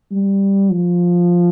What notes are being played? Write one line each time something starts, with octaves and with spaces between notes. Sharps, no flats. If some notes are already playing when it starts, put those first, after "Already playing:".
G3
F3